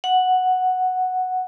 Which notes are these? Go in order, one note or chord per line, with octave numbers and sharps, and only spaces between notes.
F#5